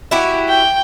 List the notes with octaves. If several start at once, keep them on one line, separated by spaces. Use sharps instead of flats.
E4 F#4 G4
G5